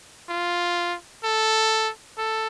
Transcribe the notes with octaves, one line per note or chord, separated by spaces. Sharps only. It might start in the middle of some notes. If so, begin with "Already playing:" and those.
F4
A4
A4